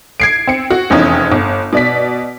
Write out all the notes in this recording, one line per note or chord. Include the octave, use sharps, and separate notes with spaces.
G#6 C7 D7
C4 C#7
F#4
F1 E2 C4 C#4 D#4 D#6
G1
B2 D5 B6